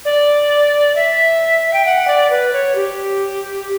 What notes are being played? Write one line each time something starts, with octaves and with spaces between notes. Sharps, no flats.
D5
E5
G5
F#5
D5
B4
C#5
G4